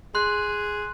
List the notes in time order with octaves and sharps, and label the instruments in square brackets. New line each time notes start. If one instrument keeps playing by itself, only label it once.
[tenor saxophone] G#4 [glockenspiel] C6 F#6